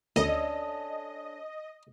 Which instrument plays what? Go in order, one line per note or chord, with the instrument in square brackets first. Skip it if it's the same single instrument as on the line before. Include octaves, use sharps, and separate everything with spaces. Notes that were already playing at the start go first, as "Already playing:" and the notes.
[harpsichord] D2 [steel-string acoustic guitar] C#4 D4 A4 [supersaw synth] D#5